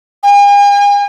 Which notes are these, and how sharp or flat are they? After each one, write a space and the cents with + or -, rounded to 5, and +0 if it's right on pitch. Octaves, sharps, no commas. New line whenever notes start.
G#5 -45